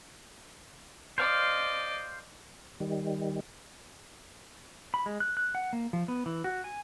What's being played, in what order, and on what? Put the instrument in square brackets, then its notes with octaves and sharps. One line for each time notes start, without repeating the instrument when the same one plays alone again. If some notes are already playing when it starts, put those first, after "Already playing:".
[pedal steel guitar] C5 F5 [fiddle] D5 D#5
[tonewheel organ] D#3 G3
[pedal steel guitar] B5
G#3
F#6
F#6
F#5
A#3
F3
B3
E3
F#4
G#5